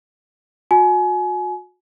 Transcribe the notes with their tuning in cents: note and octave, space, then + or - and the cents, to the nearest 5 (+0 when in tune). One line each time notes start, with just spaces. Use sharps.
F#4 -35 G#5 +30